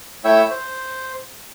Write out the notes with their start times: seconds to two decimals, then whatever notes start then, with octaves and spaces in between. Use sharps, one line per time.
0.25 A3 E4 C#5 E5 G5 E6
0.51 C5